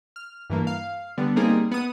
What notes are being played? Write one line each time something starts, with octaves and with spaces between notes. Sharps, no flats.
F6
G2 E3 A#3
F5
D3 G3 B3
G3 A#3 C4 D#4 G#4
B3 D#6